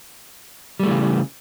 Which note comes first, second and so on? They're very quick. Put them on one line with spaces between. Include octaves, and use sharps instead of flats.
G3 A3 E3 C#3